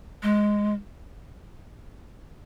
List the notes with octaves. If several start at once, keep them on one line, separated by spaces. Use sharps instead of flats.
G#3